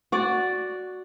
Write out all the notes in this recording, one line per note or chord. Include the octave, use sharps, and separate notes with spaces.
F#4 D5